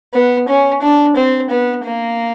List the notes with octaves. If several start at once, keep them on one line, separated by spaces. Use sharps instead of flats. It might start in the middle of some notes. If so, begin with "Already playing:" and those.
B3
C#4
D4
C4
B3
A#3